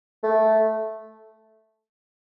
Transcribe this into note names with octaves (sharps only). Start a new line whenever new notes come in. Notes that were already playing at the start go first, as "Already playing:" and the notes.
A3